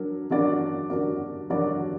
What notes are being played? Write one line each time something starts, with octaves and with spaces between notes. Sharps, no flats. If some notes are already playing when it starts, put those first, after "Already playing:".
Already playing: F#3 D4 F#4 A#4
F#3 D4 F#4 A#4 D5
F#3 D4 F#4 A#4 D5
F#3 D4 F#4 A#4 D5